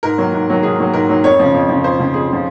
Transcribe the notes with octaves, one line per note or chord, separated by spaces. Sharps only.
G#2 A#4
D#3 F#3 A#3
G#2
D#3 F#3 A#3
G#2 G#4
D#3 F#3 A#3
G#2 A#4
D#3 F#3 A#3
F2 C#5
C#3 F3
F2
C#3 F3
F2 C5
C#3 F3
F2 G#4
C#3 F3